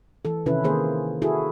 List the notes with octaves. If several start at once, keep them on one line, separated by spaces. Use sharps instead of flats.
E3 A4
C3 D#3 C#4 E4 B4
D#3 A#3 G#4 C5
E4 F#4 G#4 A4